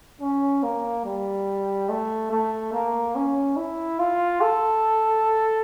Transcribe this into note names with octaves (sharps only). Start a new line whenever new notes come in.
C#4
A#3
G3
A3
A3
A#3
C#4
E4
F4
A4